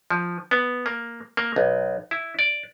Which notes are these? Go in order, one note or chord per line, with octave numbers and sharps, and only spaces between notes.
F3
B3
A#3
A#3
B1
E4
D5